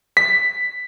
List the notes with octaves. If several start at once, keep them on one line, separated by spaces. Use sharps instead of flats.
B6